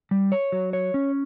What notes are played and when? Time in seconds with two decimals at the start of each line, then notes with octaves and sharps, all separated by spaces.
0.11 G3
0.32 C#5
0.52 F#3
0.73 C#5
0.94 C#4